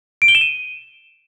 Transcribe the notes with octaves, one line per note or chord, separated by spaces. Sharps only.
D7
G7
E7
D#7